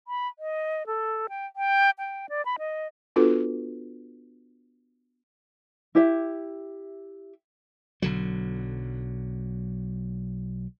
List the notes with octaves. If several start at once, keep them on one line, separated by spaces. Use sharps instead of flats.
B5
D#5
A4
G5
G5
G5
D5
B5
D#5
B3 D4 F4 F#4 A4 B4
E4 G4 E5
B1 D3 F#3